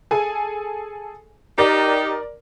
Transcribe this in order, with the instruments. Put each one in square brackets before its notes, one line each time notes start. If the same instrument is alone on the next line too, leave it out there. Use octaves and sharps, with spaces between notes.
[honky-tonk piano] G#4 A4 G#5
[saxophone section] D#4 G4 [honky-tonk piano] A#4 D5